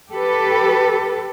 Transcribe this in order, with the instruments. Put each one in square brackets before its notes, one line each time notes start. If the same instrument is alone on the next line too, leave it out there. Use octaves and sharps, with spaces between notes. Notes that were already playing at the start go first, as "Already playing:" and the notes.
[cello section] G4 A4 B4